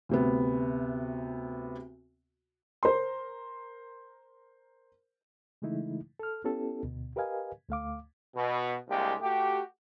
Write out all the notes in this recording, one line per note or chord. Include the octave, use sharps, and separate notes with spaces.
D2 C3 B3
A#4 C5 C6
C#3 E3 G#3 A3 D#4 E4
A4 F6
B3 C#4 E4 G4 A4
D2 B2
G4 A#4 B4 D#5 F5 G#5
D2 A3 F5 D6
B2
C2 G#3 A#3 D4 G4
A3 F#4 G4